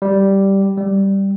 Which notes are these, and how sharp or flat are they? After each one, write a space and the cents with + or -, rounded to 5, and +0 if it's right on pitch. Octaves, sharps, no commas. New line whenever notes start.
G3 -5
G3 +0